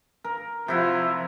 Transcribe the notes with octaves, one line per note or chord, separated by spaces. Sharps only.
A#4
C3 F3 E4 F#4